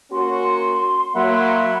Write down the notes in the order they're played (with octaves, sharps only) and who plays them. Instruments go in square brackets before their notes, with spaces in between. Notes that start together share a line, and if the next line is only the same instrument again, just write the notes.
[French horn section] A#3 C#4 F#4 [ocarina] C6
[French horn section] F#3 A#3 [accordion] E5 F#5 B5